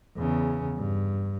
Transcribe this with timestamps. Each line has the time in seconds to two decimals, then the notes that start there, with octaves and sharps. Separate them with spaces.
0.17 E2 C#3
0.77 G2